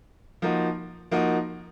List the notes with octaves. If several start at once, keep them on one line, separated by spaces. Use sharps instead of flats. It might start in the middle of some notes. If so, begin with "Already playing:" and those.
F3 A#3 D#4 F#4
F3 A#3 D#4 F#4